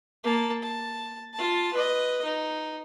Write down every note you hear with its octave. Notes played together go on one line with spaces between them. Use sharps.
A#3 A5
A5
F4 A5
B4 D#5
D#4